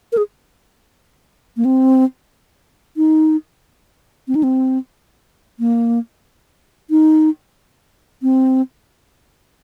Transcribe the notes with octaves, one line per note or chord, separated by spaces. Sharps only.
A#4
G#4
A#3
C4
D#4
C4
D#4
C4
A#3
D#4
C4